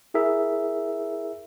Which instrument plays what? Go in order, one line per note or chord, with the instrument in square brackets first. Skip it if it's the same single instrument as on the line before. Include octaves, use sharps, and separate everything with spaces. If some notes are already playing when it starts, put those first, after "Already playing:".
[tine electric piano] E4 G#4 A#4 E5